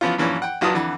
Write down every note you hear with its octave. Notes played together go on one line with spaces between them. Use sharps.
E3 F3 B3 C#4 F4
G2 A#2 E3 F3 A#3 C#4
F#5 G5
A#1 F#3 F4 B4 A5 D#6
F2 D3 E3 F#5